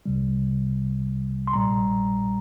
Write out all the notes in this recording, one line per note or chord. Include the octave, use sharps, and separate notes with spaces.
C2 C3 G3
C6
A#1 A#2 G3 A#5